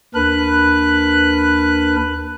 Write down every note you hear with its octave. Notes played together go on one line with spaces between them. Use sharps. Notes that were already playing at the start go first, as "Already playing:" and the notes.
D#2 D4 A#4 B4 F#6